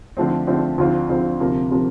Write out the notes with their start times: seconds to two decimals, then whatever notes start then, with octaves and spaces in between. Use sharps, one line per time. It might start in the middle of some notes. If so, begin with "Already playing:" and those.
0.17 D3 F3 A3 C4
0.47 D3 F3 A3 C4
0.78 D2 D3 F3 C4 F4
1.09 D2 D3 F3 C4 F4
1.40 D2 C3 F3 A#3
1.71 C3 F3 A#3